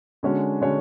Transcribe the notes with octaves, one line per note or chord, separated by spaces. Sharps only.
D3 G#3 C#4 F#4 C#5
D3 G#3 C#4 F#4 C#5